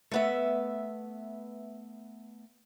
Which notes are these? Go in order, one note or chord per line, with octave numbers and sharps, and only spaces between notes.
A3 B3 E5